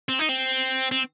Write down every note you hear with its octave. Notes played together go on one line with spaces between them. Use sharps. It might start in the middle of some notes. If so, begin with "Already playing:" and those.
C4
D#4
C4
C4